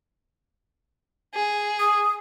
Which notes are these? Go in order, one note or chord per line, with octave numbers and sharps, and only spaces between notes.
G#4
D#6